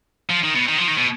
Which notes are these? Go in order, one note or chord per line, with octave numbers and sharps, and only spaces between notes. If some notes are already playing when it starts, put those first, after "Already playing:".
F3
D#3
B2
D#3
F3
D#3
B2